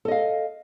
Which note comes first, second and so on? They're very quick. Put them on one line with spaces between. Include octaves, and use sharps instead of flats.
A4 D#5 F5